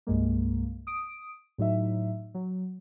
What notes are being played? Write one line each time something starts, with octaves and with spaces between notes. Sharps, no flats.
C2 G2 G#3 A#3
D#6 D7
A2 F#3 D#4 E5
F#3